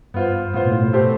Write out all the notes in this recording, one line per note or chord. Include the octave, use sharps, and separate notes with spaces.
G2 B3 F4 C5
A2 B3 F4 C5
B2
A2
A3 C4 G4 C5